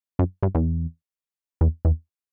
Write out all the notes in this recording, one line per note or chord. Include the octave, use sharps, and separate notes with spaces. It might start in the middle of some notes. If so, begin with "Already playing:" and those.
F#2
G2
E2
E2
E2